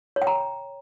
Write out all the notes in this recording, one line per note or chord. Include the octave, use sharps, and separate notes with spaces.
C#5
G5
A#5